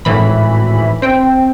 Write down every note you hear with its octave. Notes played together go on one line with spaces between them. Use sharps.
G#1 A2 E3 B5
C4 G5